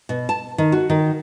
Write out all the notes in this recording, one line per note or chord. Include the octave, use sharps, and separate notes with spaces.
B2
A5
D#3
F#4
D#3